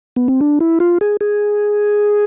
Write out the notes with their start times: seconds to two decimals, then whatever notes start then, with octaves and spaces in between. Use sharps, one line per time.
0.16 B3
0.28 C4
0.41 D4
0.61 E4
0.80 F4
1.01 G#4
1.21 G#4